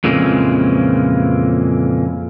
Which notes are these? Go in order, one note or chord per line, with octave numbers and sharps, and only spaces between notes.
F2 A#2 C#3 E3 G#3 C4